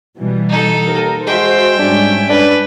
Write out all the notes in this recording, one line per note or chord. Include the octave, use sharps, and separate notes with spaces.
B2 E3 G3
D#4 A4
D#2 A#4
G#3 F#4 C5 E5 G5
G#2 G3 C#4 D4
D4 B4